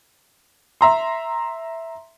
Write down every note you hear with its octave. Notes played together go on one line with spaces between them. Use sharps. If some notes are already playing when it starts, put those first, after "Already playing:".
E5 A#5 C6